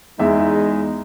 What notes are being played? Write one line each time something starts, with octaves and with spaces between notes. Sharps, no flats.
E2 G#3 D#4 E5